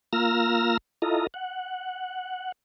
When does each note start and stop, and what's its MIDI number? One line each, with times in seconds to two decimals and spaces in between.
0.13 0.77 58
0.13 0.77 65
0.13 0.77 82
0.13 0.77 88
0.13 0.77 89
0.13 0.77 94
1.02 1.27 64
1.02 1.27 65
1.02 1.27 69
1.02 1.27 75
1.02 1.27 82
1.34 2.52 78